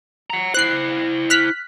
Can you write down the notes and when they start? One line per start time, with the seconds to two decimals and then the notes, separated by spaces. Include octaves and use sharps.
0.30 F#5 A#5
0.54 E4 C5 F#6 C7
1.30 F6 F#6 B6